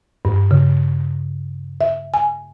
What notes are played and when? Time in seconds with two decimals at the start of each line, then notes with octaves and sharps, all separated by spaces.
0.25 G2
0.51 C#3
1.81 E5
2.14 G#5